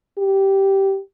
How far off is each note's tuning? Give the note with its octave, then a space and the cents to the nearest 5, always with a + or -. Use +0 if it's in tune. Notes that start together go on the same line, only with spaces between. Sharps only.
G4 -10